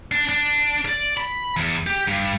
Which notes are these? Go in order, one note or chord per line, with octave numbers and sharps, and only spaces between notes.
D4
D4
D5
B5
E2
G4
G2